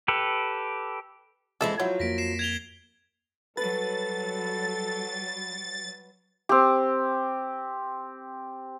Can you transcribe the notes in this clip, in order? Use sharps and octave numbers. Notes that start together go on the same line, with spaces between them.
G4 A4 B4
F2 E3 G#3 A4 E5
F3 F#3 E4 C#5 F#5 G6
F2 A#3 A#6 B6 D7
A#6 C7 E7
G#6 F7 G7
F#3 G3 A4 B4 A6
C4 G4